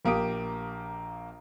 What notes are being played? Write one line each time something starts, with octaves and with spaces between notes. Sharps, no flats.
A#1 A#3 G4 D#6 D7